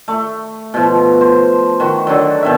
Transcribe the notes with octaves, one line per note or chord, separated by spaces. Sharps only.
A3
B2 F3
C5
D#3 F#4
D3 F#3
B2 D#3 E5